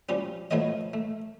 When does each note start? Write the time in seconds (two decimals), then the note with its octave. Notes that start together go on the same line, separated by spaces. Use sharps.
0.09 F3 G3 C#4
0.51 F3 A3 B3 C#5 D#5
0.94 A3